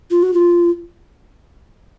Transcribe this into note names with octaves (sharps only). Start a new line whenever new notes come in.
F4
F#4
F4